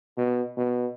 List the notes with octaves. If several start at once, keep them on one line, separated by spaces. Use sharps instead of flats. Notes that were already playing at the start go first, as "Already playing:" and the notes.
B2
B2